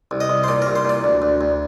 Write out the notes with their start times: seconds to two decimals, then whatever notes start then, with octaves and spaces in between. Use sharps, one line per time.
0.11 C2
0.20 D#5
0.30 C2
0.44 C5
0.48 A#2 D5
0.62 C2 A#4
0.75 C5
0.85 A#2 D5
1.04 D2
1.22 D2
1.41 D2